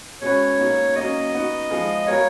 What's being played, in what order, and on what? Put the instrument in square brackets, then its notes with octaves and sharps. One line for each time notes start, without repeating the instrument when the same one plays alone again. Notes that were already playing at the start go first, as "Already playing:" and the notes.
[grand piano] B2 G#3 C#4 F#4 B4 [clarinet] C#5
[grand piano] B2 A#3 D#4
[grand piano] F#3 A#3 C#4 [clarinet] D#5
[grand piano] B3 D#4 F#4
F3 G#3 B3 F4 G#4
[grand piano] G#3 B3 F#4 A#4 F5 [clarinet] C#5